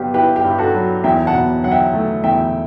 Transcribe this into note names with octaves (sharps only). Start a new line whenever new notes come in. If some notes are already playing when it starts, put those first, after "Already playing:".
Already playing: G2 F#3 B3 G4
E4 G4 B4
G4
G2
F#4 A4
F#3
E2 E5 G5
F#5 A5
B2
F#3 F#5
E5 G5
A3
E2 E5 G5